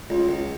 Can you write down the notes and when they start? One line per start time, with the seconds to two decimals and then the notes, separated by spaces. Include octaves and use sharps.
0.10 C#2 F4
0.29 C#2